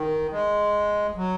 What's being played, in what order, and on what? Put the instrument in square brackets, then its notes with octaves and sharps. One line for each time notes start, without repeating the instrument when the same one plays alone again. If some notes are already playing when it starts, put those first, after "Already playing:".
Already playing: [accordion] D#3
G#3
F#3